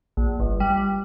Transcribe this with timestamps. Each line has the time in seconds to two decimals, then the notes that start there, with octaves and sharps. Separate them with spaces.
0.17 A#1
0.40 G1
0.60 G3